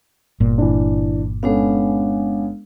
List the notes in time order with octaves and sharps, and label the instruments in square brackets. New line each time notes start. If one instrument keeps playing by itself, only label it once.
[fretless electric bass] G1 A#2
[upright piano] E3 D4
[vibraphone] G#3 D4 F5 [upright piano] B3 C#4 A4